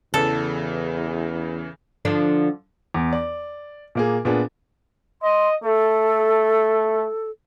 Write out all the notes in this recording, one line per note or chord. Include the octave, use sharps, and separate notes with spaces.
E2 C#3 E3 A4
D3 F3 D4
E2
D5
A#2 A#3 G#4
A#2 B3 D4 G#4
D#5 C6
A3 A4